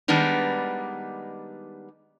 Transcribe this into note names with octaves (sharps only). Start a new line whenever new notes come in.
D#3 G3 G#3 B3 D4 D#4